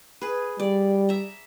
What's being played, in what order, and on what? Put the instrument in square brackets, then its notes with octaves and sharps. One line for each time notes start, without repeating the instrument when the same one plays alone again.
[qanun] G#4 B4
[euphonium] G3 [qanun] D5
[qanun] E5 A#5